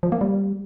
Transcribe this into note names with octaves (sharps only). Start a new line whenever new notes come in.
F3
A#3
G3